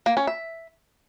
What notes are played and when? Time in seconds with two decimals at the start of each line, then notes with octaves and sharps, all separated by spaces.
0.06 A#3
0.17 C#4
0.27 E5